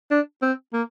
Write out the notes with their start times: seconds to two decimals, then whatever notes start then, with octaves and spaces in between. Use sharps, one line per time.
0.11 D4
0.42 C4
0.73 A#3